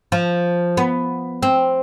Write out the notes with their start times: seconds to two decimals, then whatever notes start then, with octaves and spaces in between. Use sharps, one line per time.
0.12 F3
0.77 B3
1.42 C4